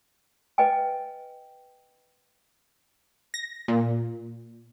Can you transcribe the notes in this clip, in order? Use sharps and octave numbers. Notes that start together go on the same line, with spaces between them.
B4 D#5 G5 G#5
A#6
A#2